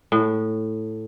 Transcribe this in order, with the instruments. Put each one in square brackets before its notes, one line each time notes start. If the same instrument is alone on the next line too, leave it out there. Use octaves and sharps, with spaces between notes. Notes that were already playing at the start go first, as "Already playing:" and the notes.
[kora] A2